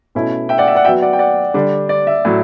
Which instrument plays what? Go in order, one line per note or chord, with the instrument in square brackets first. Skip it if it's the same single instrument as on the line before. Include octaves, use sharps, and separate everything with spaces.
[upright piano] B2 A3 C#4 E4
[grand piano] E5 G5
D5 F#5
E5
D5 F#5
[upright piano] F#3 B3 F#4 [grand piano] E5 G5
[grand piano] D5 F#5
G5
D5 F#5
[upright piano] D3 G3 D4
[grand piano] D5
E5
[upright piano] A2 F#3